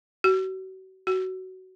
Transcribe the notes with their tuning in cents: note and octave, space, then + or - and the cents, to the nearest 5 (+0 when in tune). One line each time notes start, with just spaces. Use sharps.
F#4 +35
F#4 +15